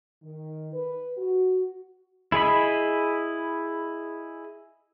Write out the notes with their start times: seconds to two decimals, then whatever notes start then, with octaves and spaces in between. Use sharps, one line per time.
0.23 D#3
0.73 B4
1.16 F#4
2.32 E4 G#4 D#5 B5